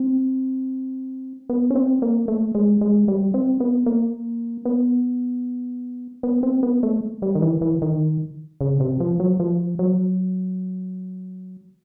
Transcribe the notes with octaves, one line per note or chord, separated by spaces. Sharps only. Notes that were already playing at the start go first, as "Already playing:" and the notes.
Already playing: C4
B3
C#4
C4
A#3
A3
G#3
G#3
G3
C4
B3
A#3
B3
B3
C4
B3
A3
G3
D#3
E3
E3
D#3
C#3
C3
F3
F#3
F3
F#3